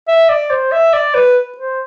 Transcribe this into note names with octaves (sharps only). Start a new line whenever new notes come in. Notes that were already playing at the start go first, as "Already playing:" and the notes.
E5
D5
C5
E5
D5
B4
C5